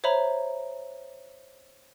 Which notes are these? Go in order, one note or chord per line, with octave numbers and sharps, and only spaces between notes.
C5 C#5 E5 A#5 B5